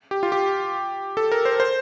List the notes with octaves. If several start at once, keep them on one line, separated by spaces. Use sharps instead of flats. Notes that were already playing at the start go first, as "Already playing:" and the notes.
G4
F4
G4
A4
A#4
C5
C5